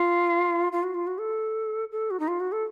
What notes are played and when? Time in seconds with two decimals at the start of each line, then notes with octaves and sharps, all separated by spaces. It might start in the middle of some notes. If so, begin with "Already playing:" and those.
Already playing: F4
0.72 F4
0.83 F#4
0.95 F4
1.07 F#4
1.19 A4
1.92 A4
2.11 F#4
2.20 D#4
2.28 F4
2.40 F#4
2.52 A4